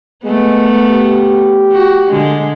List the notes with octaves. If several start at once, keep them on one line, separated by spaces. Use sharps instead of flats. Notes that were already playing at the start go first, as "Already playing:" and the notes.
G#3 A3 B3
G4
F#4
D3 G#3